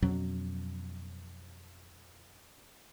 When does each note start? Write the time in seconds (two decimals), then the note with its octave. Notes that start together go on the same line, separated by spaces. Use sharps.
0.02 F2 B2 F#3 C#4